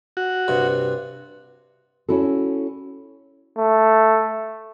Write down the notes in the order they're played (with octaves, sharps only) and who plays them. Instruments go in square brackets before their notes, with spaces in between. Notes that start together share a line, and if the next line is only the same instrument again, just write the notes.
[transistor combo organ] F#4
[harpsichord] G2 C3
[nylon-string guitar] C#4 E4 F#4 A4
[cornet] A3